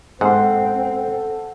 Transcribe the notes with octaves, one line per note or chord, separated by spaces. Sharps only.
G#2 C4 A4 F#5 C6